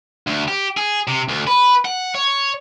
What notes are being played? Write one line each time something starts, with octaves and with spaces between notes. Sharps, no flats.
D2
G4
G#4
C3
D2
B4
F#5
C#5